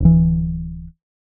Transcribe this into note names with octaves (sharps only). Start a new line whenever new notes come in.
D1 E3